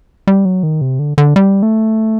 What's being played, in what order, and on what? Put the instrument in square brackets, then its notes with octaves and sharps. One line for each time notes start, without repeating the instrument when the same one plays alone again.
[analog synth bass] G3
F#3
D#3
C3
D3
D3
G3
A3